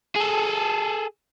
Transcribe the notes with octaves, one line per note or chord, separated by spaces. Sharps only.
G#4 A4